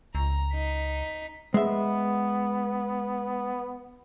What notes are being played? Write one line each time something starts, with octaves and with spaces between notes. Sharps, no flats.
C#2 A#5
D#4 B6
G#3 B3 E5